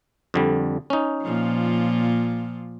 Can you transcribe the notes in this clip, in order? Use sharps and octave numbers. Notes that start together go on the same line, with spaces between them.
F2 D3 G3
C#4 D#4
A#2 F3